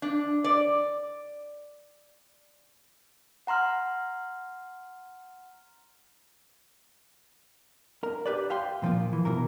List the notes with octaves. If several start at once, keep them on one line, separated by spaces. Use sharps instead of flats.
D4
D5
F#5 A#5 C6 F6
A#4
G4 B4 D5
E5 F5 G5 C6
A#2 F3 A#3 F4
E3
B2 E3 A#4